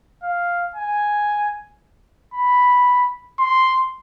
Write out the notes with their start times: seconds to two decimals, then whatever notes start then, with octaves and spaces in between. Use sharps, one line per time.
0.23 F5
0.75 G#5
2.34 B5
3.39 C6